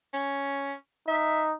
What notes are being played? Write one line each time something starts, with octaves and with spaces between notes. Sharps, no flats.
C#4
D#4 E5